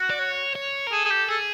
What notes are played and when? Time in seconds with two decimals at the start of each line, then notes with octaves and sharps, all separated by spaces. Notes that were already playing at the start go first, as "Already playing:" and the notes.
Already playing: F#4
0.10 D5
0.19 C#5
0.55 C#5
0.87 A#4
0.92 G#4 A4
1.05 G#4
1.11 G4
1.28 G#4 A4